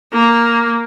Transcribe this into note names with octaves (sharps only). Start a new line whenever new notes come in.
A#3